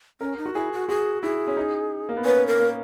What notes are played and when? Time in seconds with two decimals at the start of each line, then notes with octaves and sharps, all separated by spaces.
0.21 C#4 A#4
0.38 D#4
0.46 F#4
0.54 E4 G#4
0.72 F#4
0.89 F#4 G#4
1.23 E4 G#4
1.47 C#4
1.57 D#4
2.09 A#3
2.17 B3
2.25 C#4 B4
2.47 A#4
2.59 A#3